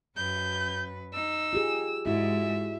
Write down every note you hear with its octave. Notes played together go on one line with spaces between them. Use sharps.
F#2 B4 G6
D#4 E6
F4 G4 G#4
G#2 G#3 E4 F#4 E5